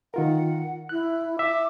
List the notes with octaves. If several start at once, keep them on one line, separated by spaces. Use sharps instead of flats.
D#3 F4 A#4 F#5
E4 F#6
E5 D6 E6